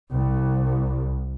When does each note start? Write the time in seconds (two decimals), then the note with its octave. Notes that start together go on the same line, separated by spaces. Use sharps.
0.12 C2